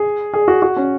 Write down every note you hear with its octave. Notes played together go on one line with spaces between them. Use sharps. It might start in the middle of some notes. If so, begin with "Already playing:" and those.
Already playing: G#4
G#4
F#4
F#4
C#4